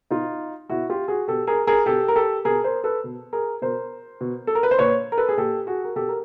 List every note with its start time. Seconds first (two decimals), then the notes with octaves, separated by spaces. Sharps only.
0.11 B2 D#4 F4
0.70 B2 E4 F#4
0.90 F4 G4
1.08 F#4 G#4
1.28 B2 G4 A4
1.47 G#4 A#4
1.67 G#4 A#4
1.86 B2 G4 A4
2.08 A#4
2.16 G4 A4
2.45 B2 G#4 A#4
2.64 A#4 C5
2.84 A4 B4
3.04 B2
3.33 G#4 A#4
3.62 B2 A#4 C5
4.21 B2
4.47 A4
4.55 A#4
4.63 B4
4.71 C5
4.79 A#2 B4 C#5
5.12 A#4
5.18 A4 B4
5.29 G#4
5.37 A#2 G4 A4
5.67 F#4 G#4
5.84 A#4
5.96 B2 G4 A4
6.09 A#4